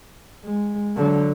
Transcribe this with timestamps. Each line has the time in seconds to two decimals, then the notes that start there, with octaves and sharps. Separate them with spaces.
0.45 G#3
0.97 D3 F#3